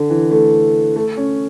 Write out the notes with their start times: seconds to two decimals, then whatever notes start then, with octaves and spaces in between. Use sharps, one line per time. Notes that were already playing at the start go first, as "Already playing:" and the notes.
Already playing: D3
0.10 E3
0.31 A3
0.96 A3
1.17 C#4